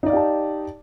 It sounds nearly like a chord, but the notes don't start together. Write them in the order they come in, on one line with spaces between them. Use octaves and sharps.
D#4 D5 F5 G4 A5